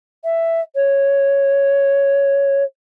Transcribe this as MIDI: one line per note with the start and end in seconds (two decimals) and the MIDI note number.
0.24 0.60 76
0.75 2.63 73